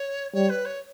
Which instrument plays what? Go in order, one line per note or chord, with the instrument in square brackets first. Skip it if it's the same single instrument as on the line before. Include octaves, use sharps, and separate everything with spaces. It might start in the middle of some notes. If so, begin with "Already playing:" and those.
Already playing: [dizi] C#5
[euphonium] G3 [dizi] C#5
[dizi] B4
C#5